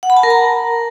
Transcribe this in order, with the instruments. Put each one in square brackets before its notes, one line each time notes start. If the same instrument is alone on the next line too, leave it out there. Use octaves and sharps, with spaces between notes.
[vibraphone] F#5
B5
A5
A#4
A#5